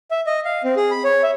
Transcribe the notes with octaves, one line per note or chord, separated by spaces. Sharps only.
E5
D#5
F5
C4
G#4
B5
C#5
E5